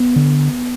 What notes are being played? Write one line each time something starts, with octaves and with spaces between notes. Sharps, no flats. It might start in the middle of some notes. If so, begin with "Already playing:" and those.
Already playing: B3
D3